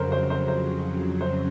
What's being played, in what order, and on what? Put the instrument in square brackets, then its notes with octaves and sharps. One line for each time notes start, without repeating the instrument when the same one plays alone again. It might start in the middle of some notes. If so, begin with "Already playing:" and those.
Already playing: [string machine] F2 C#3 F#3 [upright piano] A#4 C5
[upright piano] C5
C5
C5
C5